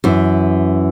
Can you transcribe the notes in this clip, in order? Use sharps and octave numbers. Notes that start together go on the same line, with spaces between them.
F#2 E3